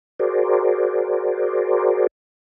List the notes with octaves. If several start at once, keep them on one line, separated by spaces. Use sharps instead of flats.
F#4 G#4 A#4 C5 D5